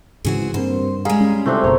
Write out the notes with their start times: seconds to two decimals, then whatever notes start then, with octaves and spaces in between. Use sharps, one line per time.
0.25 G#2 C#3 E3 C4 F#4 G#4
0.54 G2 G3 A#3 C4 C5
1.05 G3 G#3 G#4 F5 A#5
1.21 C#4
1.46 C2 A3 C4 D4 F4 E5
1.64 F#1 B2 F4 A#4 C#5 A#5